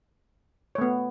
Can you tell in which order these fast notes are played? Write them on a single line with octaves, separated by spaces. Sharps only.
C#5 A3 B3